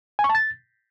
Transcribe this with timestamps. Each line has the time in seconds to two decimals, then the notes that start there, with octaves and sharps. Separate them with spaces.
0.19 G#5
0.24 C#6
0.29 A5
0.35 A6